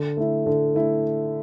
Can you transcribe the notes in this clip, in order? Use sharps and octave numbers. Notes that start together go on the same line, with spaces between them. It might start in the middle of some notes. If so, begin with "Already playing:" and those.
Already playing: D3
A3 E4
D3
A3 E4